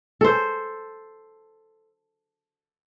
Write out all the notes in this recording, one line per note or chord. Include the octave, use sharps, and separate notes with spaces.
A4 C5